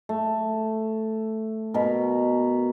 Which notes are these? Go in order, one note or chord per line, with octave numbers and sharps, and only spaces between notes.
A3
B2 A#4